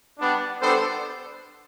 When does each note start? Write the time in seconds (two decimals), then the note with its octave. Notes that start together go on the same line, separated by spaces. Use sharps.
0.18 G3 B3 D4
0.60 G3 B3 D4 A4 C5